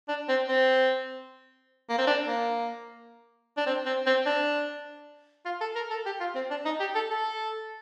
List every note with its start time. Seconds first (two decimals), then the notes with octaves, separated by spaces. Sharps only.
0.09 D4
0.29 C4
0.49 C4
1.90 A#3
1.99 C4
2.07 D4
2.27 A#3
3.57 D4
3.67 C4
3.86 C4
4.07 C4
4.26 D4
5.46 F4
5.61 A4
5.76 A#4
5.91 A4
6.06 G4
6.20 F4
6.35 C4
6.51 D4
6.65 D#4
6.80 G4
6.95 A4
7.10 A4